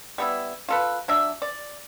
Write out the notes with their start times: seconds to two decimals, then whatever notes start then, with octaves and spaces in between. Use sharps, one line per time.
0.18 G3 B3 E4
0.69 F4 A4 B4
1.08 F#3 D4 E5
1.42 D5